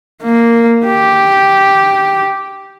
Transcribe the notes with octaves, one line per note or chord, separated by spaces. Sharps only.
A#3
G4